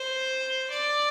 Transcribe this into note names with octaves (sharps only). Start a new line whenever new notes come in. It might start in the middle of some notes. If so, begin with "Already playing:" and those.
Already playing: C5
D5